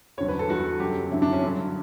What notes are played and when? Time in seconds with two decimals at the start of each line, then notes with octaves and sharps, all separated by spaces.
0.18 E2 C#5
0.20 D3 F#3
0.28 B4
0.39 A4
0.49 E2 D3 F#3 F#4
0.80 F#2 D3 F#3 G4
1.11 F#2 D3 F#3 E4
1.22 D4
1.33 C#4
1.42 G2 D3 F#3